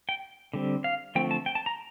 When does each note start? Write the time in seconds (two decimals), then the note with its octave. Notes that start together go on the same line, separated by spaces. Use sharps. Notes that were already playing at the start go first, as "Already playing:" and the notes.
0.09 G5
0.53 D3 G3 C4
0.84 F5
1.15 D3 F3 A3 C4 G5
1.31 A5
1.46 G5
1.55 A5
1.66 A#5